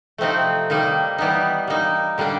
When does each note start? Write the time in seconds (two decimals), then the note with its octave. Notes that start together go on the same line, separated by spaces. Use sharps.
0.18 C3 F3 A3 C4 D#4
0.70 D#3 G3 A#3 D#4
1.18 E3 G3 B3 D#4
1.68 G3 A#3 D#4
2.18 D3 G3 A#3 D4